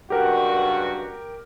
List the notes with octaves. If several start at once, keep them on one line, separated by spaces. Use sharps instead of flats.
C#2 G2 F#4 G4 A#4